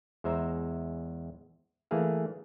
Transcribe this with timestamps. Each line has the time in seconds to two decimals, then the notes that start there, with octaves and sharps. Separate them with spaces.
0.24 E2 G#3 C5 E5 A#5
1.91 E3 A3 A#3 G#4 F5